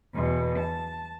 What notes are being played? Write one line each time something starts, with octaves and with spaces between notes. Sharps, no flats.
E2 B2
A5